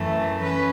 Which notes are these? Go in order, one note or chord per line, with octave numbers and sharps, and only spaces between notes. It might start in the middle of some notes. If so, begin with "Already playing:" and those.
Already playing: F#2 E3 A3
C#4 B4